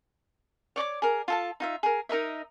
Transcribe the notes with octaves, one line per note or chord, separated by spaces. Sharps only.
C#5 D5 C#6 D6
G#4 A#4
F4 A4 A5
D#4 F4 E5
G#4 A#4
D#4 A#4 D#5 E5